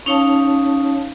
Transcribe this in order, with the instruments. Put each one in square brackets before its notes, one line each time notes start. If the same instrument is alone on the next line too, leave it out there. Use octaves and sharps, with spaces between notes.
[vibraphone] C#4 D#4 C#5 F5 A5